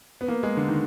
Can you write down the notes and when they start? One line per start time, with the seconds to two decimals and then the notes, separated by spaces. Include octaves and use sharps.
0.21 B3
0.28 A#3
0.43 G#3
0.57 D3
0.68 D#3